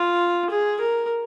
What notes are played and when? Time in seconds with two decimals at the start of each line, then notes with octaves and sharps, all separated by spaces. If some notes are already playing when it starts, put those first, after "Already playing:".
Already playing: F4
0.50 G#4
0.80 A#4